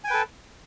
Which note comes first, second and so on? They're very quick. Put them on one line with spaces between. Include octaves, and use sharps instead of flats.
G#5 G5 B4 A4